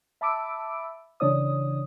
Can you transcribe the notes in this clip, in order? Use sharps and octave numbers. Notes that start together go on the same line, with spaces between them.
E5 A5 B5 D6 E6 D7
C#3 E3 D4 C#5 D5 D#6